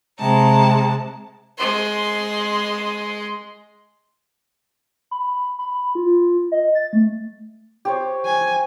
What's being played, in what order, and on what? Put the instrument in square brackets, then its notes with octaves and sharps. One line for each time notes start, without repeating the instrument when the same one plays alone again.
[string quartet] C3 G#3 A5 A#5
[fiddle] G#3 C6
[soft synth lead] B5
B5
F4
D#5
A6
A3
[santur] G4 C5 C#5
[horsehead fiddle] G#5